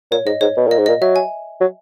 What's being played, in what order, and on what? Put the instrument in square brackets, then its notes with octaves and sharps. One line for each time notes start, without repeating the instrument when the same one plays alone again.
[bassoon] A#2 [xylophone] C#5
[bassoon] G#2 [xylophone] D#5
[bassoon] G#2 [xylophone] C#5
[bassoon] B2
[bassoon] A#2 [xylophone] D#5
[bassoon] G#2
[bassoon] A#2 [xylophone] D#5
[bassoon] F#3 [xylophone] E5
[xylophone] G#5
[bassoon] F#3